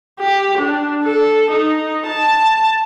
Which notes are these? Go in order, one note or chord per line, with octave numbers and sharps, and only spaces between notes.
G4
D4
A4
D#4
A5